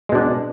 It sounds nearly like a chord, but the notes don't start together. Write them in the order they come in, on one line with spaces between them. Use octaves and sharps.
G#3 B2 D4